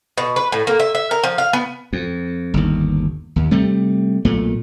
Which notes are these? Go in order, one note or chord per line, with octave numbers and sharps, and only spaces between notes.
B2
B4
A2
A#3
E5
E5
A#4
F3
F5
B3
F2
G1 D#2
D#2
C3 G3 A3
B1 A#2 A3